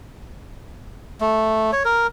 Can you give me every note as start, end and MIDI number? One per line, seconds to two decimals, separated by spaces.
1.21 1.71 57
1.73 1.83 73
1.85 2.07 70